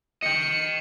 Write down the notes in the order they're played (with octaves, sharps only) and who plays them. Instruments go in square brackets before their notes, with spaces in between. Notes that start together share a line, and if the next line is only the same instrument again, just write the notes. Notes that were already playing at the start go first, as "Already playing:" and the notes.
[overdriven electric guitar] D#5 G5 [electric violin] C#7